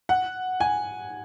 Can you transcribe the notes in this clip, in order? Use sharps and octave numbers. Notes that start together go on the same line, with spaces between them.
F#5
G#5